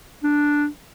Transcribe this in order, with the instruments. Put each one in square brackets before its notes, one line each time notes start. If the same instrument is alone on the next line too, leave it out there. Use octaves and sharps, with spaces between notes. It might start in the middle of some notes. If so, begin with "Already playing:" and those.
[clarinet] D4